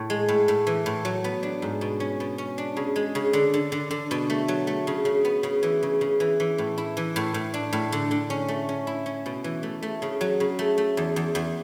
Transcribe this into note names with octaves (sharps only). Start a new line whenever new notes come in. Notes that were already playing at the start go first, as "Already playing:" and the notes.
Already playing: A2
G#3
A2
A2
E3
A2
F#3
B3
D4
G#2
B2
C#4
B2
C#4
D4
C#3
G#3
C#3
D3
D3
D3
D3
B2
A3
F#3
A3
C#3
C#3
B3
C#3
E3
C#3
C#3
E3
E3
A2
E4
E3
A2
A2
D4
A2
D3
D3
C#4
A3
C#4
E4
C#4
B2
E3
A3
A3
C#3
F#3
C#3
A3
A3
E2
E2
E2